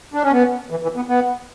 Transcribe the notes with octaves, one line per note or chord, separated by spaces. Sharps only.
D4
C#4
B3
E3
E3
B3
B3